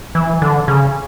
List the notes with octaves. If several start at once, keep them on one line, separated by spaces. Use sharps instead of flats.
E3
D3
C#3